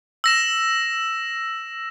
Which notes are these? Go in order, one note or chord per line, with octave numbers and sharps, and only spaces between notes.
E6 A#6 E7